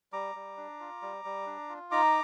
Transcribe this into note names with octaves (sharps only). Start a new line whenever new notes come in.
G3 A#5 D6
G3
D4
F4
G3
G3
D4
F4
D#4 A#5 D6